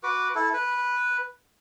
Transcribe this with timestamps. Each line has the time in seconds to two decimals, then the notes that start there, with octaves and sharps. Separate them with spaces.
0.03 F#4 B4 D6
0.35 E4 A4
0.54 B4